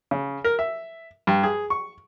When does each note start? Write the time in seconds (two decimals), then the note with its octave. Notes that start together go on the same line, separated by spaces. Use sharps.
0.11 C#3
0.44 A#4
0.59 E5
1.27 G2
1.43 G#4
1.70 C#6